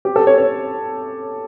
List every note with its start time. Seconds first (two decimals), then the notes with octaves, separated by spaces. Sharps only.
0.05 G4
0.16 A4
0.27 C#5
0.38 C#5